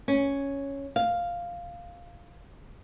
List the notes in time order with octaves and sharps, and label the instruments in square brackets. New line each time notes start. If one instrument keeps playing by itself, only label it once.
[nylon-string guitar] C#4
F5